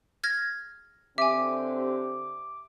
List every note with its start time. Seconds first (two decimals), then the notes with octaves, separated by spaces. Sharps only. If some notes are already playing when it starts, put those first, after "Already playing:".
0.23 F6 G#6 A#6
1.18 D3 C4 G4 E5 G#5 D6